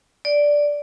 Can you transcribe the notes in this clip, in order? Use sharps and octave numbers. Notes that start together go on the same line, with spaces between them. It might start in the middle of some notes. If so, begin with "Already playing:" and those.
D5